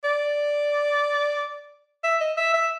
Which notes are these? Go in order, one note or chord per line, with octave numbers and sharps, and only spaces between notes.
D5
E5
D#5
E5
E5